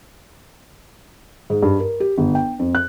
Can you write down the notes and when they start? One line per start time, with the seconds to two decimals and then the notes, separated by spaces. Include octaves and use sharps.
1.50 G#2
1.63 G2
1.80 A#4
2.00 G4
2.18 G1
2.35 G5
2.59 F2
2.75 F#6